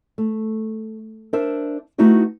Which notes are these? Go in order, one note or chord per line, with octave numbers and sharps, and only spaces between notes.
A3
D4 A#4 C5 E5
A3 B3 D#4 E4 F#4 G4